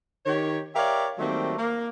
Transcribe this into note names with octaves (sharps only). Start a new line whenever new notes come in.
D#3 G4 C#5
G4 A#4 C#5 D5 E5 F5
D#3 F#3 G3 A3 A#3 C4
A#3